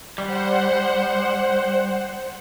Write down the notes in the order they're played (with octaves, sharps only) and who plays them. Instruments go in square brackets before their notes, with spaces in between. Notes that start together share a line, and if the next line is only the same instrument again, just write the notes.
[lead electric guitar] G3 [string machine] C5 F#5